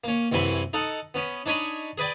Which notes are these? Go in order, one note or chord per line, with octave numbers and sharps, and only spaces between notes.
A#3 C#4
C2 F#2 E3 F#3 G#5 B5
D#4 A4 F#5
B3 C#4
D4 D#4 C#5 G#5 B5
G#4 B4 D5 G5